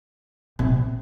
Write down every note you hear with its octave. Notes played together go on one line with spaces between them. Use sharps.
C3